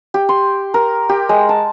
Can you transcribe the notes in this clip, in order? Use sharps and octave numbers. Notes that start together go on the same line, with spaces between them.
G4
C6
A#4
G4
G#3
A5